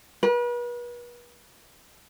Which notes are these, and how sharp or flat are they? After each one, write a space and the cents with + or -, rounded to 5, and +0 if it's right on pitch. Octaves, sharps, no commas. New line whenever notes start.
B4 -40